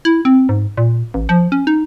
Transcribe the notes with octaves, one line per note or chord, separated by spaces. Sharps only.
E4
C4
G#2
A#2
A1
F3
C#4
D#4